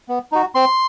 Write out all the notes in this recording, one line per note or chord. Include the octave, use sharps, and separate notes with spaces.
B3
D#4 F#4
C4 C6